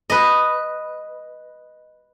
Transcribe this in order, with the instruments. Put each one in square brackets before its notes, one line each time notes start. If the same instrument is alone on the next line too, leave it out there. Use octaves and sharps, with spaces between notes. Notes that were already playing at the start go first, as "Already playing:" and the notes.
[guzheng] B4 D#5